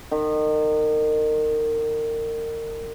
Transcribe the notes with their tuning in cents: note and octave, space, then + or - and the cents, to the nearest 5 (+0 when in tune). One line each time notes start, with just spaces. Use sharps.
D#3 -30